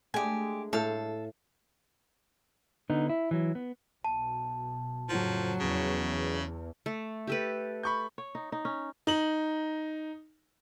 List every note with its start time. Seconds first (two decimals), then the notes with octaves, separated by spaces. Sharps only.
0.14 G#3 A3 D4 G4 G#5
0.73 A2 A4 F5
2.90 D3 B3 D#4
3.09 E4
3.31 E3 F#3
3.55 B3
4.05 B1 B2 A5
5.09 F2 A2 C#3 F3 F#3
5.60 E2 C#3
6.86 A3
7.27 G4 A4 B4
7.83 B5 C#6 G6
8.18 C#5
8.35 D#4
8.52 D#4
8.65 C#4
9.07 D#4 F#7